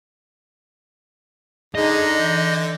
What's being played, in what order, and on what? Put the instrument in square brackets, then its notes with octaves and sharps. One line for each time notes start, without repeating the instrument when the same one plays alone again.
[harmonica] D3 [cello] D#4 [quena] G#4 [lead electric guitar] D#5
[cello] E3 [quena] G6